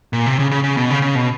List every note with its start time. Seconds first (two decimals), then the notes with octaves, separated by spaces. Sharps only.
0.13 A#2
0.26 C3
0.39 C#3
0.51 C#3
0.64 C#3
0.77 B2
0.90 C#3
1.02 C#3
1.15 B2